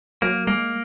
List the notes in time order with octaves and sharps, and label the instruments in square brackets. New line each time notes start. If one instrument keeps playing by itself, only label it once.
[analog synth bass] F#3 [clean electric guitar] A#3
[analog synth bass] G#3 [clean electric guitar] A#3